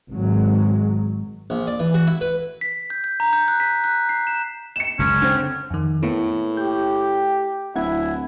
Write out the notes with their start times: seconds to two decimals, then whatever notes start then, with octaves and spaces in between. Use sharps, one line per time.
0.11 G#1 F#3 G#3
1.50 A#1
1.67 D5
1.80 E3
1.94 F#4
2.07 E4
2.21 B4
2.61 B6
2.90 G6
3.04 G6
3.20 A#5
3.33 G6
3.48 F#6
3.60 B6
3.84 F#6
4.09 C7
4.27 E7
4.76 C#7 E7
4.99 F#1 C#2 C#4
5.22 D3 C4
5.70 F2 D#3
6.03 A2 A#3 B3
6.57 G4 G6
7.76 D1 E4 F#5 G#6